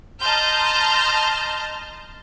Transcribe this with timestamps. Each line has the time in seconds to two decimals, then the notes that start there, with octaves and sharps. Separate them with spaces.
0.20 D#5 A5 A#5 C6 F6 G6